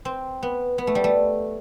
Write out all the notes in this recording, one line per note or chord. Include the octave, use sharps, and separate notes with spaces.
C4
B3
B3
A3
G3
A3